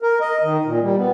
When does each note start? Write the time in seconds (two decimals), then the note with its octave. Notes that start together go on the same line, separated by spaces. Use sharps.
0.02 A#4
0.21 D#5
0.43 D#3
0.65 A#2
0.82 G3
0.96 B3